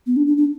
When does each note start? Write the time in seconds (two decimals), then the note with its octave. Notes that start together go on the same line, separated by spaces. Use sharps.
0.07 B3
0.16 D4
0.27 D4
0.37 D4